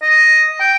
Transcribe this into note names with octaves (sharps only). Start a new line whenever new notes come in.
D#5
G5